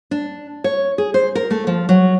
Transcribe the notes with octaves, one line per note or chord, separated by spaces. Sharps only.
D4
C#5
G#4
C5
A#4
A3
F3
F#3